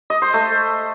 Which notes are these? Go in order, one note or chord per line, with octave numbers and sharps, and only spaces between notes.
D#5
C5
A3